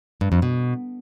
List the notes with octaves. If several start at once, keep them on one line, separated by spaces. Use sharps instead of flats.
G2
F2
B2